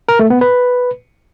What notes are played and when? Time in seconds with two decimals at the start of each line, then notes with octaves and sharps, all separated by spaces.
0.09 A#4
0.19 A3
0.30 B3
0.41 B4